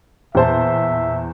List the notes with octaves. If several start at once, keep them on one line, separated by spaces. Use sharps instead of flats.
E2 A#2 C5 E5 A5